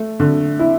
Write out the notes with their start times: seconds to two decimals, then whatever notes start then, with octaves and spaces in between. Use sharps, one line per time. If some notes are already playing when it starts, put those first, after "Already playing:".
Already playing: A3
0.20 D3
0.59 E4